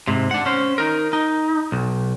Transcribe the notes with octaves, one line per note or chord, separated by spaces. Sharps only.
G#2 C3
D4 F#5
C#4 C5
D#4 A#4
D#4
B1